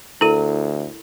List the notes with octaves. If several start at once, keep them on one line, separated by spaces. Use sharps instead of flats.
D2 E4 A4 A#4 D#7